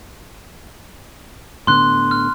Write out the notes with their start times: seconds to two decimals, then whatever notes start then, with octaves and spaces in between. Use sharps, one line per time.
1.67 A2 D3 B3 C6 F#6
2.11 F6